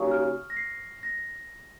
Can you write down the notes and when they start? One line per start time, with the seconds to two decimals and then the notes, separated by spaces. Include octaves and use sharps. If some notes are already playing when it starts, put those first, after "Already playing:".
Already playing: D#2 C#3 F#3 C#6 D#6
0.11 F6
0.50 A#6
0.57 C7
1.03 A#6